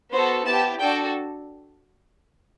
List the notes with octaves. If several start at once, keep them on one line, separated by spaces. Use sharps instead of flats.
B3 F#4 A4 C5
B3 E4 G4 A5
D4 F#4 A4 G5